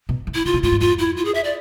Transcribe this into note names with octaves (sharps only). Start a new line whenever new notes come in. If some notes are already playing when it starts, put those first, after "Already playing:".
B2
E3
E4
D3 F4
B2
A2 F4
G#2
F2 F4
E4
F4
G#4
E5
D5